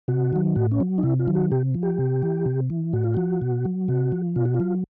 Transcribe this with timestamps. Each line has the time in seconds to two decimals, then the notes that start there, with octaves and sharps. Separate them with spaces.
0.08 C3 F#4
0.33 D#3 F#3
0.55 A2 F#4
0.71 C#4
0.80 F#3
0.98 D#4
1.03 C3 E4
1.19 F4
1.27 D#3 F#3
1.35 F#4
1.51 C3 G4
1.75 F3
1.83 G4
1.98 C3
2.23 E3
2.46 C3
2.70 E3
2.93 A2 F#4
3.04 F4
3.14 F3 F#4
3.41 B2
3.65 F#3
3.88 C3 F#4
4.12 F3
4.36 B2 F4
4.45 F#4
4.54 F4
4.60 F#3